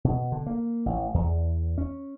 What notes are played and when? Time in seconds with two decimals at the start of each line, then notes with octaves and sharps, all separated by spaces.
0.04 B2
0.32 D3
0.46 A#3
0.86 A1
1.14 E2
1.78 C#4